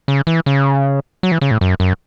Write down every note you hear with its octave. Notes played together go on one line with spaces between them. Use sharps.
C#3
E3
C#3
F#3
E3
C#3
A2
F#2
F#2